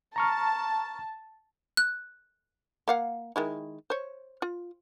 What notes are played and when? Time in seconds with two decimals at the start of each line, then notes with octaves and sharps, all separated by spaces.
0.16 A5 A#5 C#6 F6
1.77 F#6
2.88 A#3 F5 F#5
3.36 D#3 G#3 E4
3.90 C5 C#5
4.42 F4